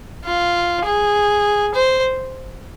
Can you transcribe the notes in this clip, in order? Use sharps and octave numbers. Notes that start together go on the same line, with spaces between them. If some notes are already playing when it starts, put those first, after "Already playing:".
F4
G#4
C5